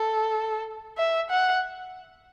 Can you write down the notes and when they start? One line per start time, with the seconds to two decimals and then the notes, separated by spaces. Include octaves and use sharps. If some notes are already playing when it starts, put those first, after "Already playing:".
Already playing: A4
0.98 E5
1.30 F#5